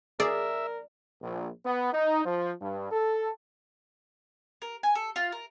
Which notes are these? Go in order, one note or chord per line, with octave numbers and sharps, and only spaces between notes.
G#4 A#4 D5 E5
A#1
B3
D#4
F3
G2
A4
A#4
G#5
A4
F4
A#4